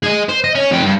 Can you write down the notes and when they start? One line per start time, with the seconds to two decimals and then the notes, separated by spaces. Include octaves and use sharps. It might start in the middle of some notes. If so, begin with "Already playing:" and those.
0.03 G#4 D#5
0.29 C5
0.44 D#5
0.55 C#4
0.71 F2 G4
0.84 G2